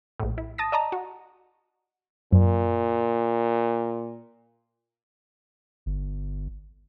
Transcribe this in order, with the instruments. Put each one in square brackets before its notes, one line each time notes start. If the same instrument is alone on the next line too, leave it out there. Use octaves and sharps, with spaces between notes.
[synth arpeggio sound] A#1 A2
E4
A5 D#6 A#6
D5 D#5 A5 A#5
F#4
[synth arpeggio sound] F#2 [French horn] A#2
[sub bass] G1